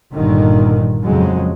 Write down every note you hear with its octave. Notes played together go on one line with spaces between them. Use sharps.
G1 G2 A#2 D3 D#3
F2 C#3 F#3 G#3